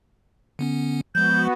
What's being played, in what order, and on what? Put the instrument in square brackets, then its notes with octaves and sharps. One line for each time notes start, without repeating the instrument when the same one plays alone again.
[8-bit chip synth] D3 B3 C#4
[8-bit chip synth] F3 G#3 [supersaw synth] B3 F#4 [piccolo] G6